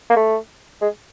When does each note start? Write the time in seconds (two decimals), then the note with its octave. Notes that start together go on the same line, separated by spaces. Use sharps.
0.10 A#3
0.16 A3
0.81 G#3